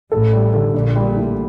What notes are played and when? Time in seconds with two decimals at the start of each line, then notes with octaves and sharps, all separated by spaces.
0.11 A1 A2 A4
0.33 G3
0.54 D3
0.74 A#1 A#2 D4
0.96 G3
1.17 A2